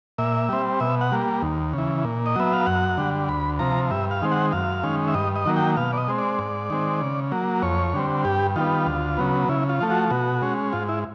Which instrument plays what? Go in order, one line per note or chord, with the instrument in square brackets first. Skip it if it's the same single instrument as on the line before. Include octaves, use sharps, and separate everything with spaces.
[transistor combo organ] A#2 E5
G3 C4
B2 E5
F#5
G3 A#3
D#2
C#3 E3
A#2
D#5
F#3 B3 E5
F5
F#2 F#5
D3 G3
D2 B5
C3 F3 A#5
G2 E5
F5
D#3 G#3 C4
F#5
F#2 F5
D#3 G#3 C#4
E5
G2 D#5
D#5
D#3 F#3 A#3
G5
B2 F5
D5
D#5
G#3 C4
D5
G#2
D#3 G#3 C4
C#3
F#3 A#3
F2 C#5
D3 G3 C4
G2 G4
D#3 G3 B3 F4
D2
C#3 F#3 B3
C#3 E4
F4
F3 A3
F#4
B2 F#4
G#3 C#4
G#2 F4
E4